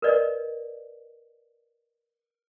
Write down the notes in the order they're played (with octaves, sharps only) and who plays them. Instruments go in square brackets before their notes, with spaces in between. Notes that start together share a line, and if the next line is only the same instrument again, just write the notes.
[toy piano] A#4 B4 D5 D#5